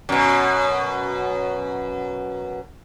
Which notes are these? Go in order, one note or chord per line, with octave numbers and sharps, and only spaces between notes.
F#2 B2